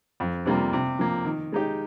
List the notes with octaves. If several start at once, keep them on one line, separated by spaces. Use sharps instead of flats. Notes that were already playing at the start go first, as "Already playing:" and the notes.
F2
C3 G3 A#3 F4
C3
F3 A#3
D#3
G#3 D#4 G4